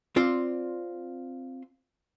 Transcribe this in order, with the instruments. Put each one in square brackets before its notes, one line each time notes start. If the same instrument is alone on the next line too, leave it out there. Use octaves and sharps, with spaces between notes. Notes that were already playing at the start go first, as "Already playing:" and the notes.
[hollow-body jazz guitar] C4 F4 D5